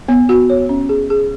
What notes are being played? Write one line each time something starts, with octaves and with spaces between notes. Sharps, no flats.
B3
F#4
C#5
C#4
G#4
G#4